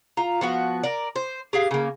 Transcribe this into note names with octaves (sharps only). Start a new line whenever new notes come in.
F4 A#5
F3 B3 F#4
A#4 D5
C5
G4 G#4 F5
C#3 A#3